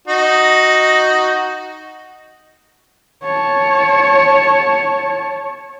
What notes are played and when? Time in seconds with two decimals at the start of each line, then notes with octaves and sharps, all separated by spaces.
0.08 D#4 F#4
3.23 C#5 A5